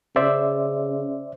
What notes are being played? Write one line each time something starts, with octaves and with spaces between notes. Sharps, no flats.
C#3 C5 D5 E5